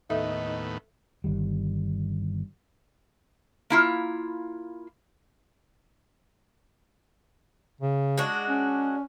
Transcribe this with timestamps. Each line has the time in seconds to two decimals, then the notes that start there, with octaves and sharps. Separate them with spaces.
0.10 D#2 A2 B3 D#4 A4 E5
1.24 G1 D#3 G3
3.70 A#3 E4 F4
7.81 C#3
8.18 G#3 D4 F#4
8.49 C#4